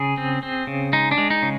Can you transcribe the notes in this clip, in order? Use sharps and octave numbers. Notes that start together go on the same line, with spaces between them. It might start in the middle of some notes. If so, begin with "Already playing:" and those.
Already playing: C#3 G#4
C4
C4
C#3
G#3 D#4
D4
G#3
D#4
C#3